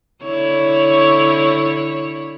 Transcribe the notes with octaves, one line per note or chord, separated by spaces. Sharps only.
D3 E4 C#5